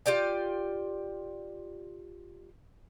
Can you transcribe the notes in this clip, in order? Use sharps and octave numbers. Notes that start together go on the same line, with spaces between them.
F4 G4 D5 G5